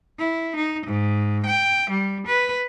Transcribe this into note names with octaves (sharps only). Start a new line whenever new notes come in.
E4
D#4
G#2
G5
G3
B4